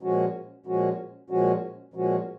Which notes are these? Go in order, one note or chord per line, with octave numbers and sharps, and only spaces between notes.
A#2 F3 G#3 C#4 F#4
A#2 F3 G#3 C#4 F#4
A#2 F3 G#3 C#4 F#4
A#2 F3 G#3 C#4 F#4